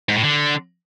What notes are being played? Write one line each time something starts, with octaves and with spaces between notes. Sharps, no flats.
G#2
A2
D3